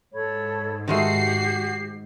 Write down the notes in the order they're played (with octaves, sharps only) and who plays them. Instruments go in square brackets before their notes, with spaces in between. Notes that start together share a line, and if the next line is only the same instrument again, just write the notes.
[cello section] G#2 [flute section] A4 C#5 B5
[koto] D#3 G#3 A3 [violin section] F#4 C7 [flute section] G4